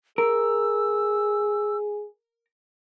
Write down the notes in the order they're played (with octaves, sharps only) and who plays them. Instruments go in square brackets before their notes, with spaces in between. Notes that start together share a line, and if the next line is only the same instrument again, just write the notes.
[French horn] G#4 [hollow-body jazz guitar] A#4 [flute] E6